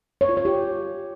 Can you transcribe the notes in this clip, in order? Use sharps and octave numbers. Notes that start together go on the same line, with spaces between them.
C#5
F4
C#5
G4